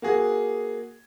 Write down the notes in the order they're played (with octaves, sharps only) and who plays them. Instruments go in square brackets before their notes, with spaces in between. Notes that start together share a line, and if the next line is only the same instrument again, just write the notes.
[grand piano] A#3 F#4 G#4